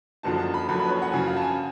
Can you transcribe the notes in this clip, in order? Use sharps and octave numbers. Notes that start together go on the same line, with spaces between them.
F#1 F#2 D3 F3 A5
A5
B5
F#1 F#2 D3 F3 B5
B5
B4
C#5
F#5
F#2 C#3 F3 G#5
F5
A5
G#5